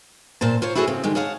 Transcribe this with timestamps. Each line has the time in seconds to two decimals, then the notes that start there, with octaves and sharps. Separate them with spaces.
0.41 A#2 C4 C5 A5
0.62 F4 C5 C#5
0.75 E4 F#4 G#4 A4 C5 C#5
0.87 C#3 C4
1.04 D3 D#3 G#3
1.15 G#4 C#5 F5 F#5 A5